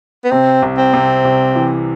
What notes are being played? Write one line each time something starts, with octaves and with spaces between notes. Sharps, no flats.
B3
C3 C4
C2
C4
C3
C2
E3